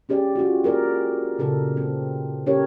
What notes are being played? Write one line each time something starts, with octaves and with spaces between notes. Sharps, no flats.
C#4 G4 G#4 D5
F4 F#4
G#4 A#4 D5
A#2 C#3 A4 A#4
C4
C#4 G4 A4 A#4 C#5